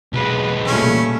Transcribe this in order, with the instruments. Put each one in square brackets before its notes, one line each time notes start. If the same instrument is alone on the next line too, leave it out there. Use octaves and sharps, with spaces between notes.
[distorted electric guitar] B1 G#3 [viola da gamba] B4
[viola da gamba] A#2 G3 A3 [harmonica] C#4